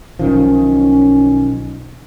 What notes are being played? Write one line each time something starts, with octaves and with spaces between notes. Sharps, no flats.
B1 D#3 F3 C#4